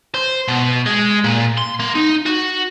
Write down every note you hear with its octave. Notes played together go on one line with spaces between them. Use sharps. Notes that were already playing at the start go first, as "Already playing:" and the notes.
C5
B2
G#3
A#2
C6
A#3
D#4
F#4